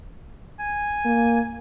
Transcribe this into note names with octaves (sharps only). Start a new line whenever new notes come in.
G#5
A#3